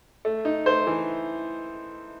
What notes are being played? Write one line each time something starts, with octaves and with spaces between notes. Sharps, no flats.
A3
D#4
A3 C5
E3